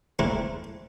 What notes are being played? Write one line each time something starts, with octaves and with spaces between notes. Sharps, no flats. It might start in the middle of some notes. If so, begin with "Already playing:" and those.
A3 C4 D4 E4 A4 A#4